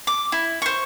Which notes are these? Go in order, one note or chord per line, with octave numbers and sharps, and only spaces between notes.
D6
E4
C5 C#6